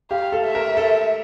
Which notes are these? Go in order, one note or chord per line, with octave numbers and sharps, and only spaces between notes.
G4 F5
A4
E5
A#4
A4